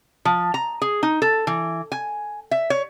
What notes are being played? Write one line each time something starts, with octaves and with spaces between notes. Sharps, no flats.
F3
A#5
G#4
D#4
A4
E3
G#5
E5
C#5